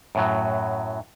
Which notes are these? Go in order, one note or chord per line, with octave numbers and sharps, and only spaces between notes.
F#2 A2 F#3